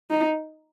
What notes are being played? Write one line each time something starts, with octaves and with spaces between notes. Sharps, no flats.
D#4